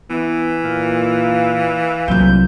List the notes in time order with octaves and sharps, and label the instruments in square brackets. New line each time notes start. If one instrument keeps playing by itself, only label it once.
[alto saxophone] E3 [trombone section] B3 E4
[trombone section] A#2 [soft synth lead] F5
[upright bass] C2 F#3 [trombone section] F2 F3 A#3 [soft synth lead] G6